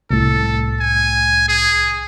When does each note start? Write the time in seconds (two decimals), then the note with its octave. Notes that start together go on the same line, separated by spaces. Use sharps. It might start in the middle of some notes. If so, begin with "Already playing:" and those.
0.11 C2 A2 A4
0.80 G#5
1.49 G#4